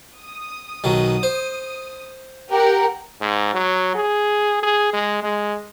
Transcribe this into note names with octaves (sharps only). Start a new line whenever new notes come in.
D#6
B1 D#3 F#3
C5
G4 A#4 F#5
G#2
F#3
G#4
G#4
G#3
G#3